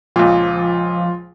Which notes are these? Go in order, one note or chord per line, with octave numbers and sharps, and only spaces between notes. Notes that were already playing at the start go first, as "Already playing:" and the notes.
C#2 A#2 F3 F4